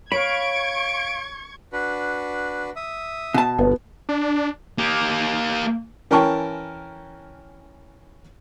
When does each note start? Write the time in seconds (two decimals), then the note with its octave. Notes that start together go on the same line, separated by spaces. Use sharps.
0.12 C#5 F5 B5 C#6 G#6 D7
1.73 D4 F#4 B4
2.76 E5 D#6
3.34 B2 A5
3.58 G1 B3
4.09 D4
4.78 A#3 G4
6.11 E3 C#4 A#4 G5 A5 C#6